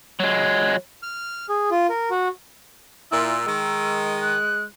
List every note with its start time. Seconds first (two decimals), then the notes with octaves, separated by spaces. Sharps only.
0.20 F#3 G#3
1.03 F6
1.49 G#4
1.71 F4
1.89 A#4
2.11 F#4
3.11 A#2 E4 E6
3.46 D#3 G#3
4.22 F#6